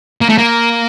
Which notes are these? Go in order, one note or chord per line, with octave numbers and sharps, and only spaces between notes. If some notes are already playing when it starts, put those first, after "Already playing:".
A#3
A3
A#3